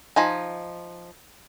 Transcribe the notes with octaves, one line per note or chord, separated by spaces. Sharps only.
F3 D#4 G#5